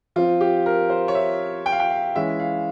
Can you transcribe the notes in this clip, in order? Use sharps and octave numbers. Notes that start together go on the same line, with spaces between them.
F3 C4 F4
G4
A#4
C5
C#5
E5
G5
F5
G5
F5
E3 G#3 C#4 E5
F5